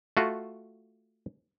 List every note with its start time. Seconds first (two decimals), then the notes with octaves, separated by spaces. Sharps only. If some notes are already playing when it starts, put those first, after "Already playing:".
0.17 A3 F4 F#4